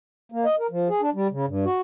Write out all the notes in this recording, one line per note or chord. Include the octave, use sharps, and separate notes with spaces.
A#3
D#5
A#4
F3
G#4
D4
G3
C#3
G2
F#4